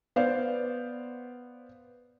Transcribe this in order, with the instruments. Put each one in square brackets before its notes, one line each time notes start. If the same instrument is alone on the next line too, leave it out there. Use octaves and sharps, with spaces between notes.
[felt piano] B3 C5 D5 F5